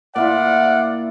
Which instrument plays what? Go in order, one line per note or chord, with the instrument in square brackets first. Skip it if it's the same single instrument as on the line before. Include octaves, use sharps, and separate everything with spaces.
[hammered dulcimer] A#2 E4 F4 [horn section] D5 F5 F#5